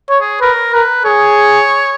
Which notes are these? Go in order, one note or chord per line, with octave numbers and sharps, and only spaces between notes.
C#5
G#4
A#4 B4
A#4 B4
G#4 C#5